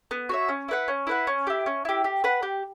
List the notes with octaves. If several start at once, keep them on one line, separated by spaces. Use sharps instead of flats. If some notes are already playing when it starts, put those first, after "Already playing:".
B3
F#4 C#5 E5
C#4
E4 B4 F#5
C#4
E4 B4 F#5
C#4
E4 G4
C#4
E4 G4
G4
B4 F#5
G4